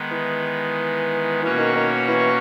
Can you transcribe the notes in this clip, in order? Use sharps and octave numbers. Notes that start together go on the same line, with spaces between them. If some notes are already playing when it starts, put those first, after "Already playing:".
Already playing: D#3 G#3 B3
E3
B2 E3 A#3 C#4 F#4 C#5
D#3
D#3
E3